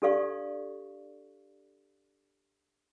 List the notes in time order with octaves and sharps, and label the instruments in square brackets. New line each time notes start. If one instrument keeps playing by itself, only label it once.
[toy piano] D4 G4 A4 D5 F5 C#6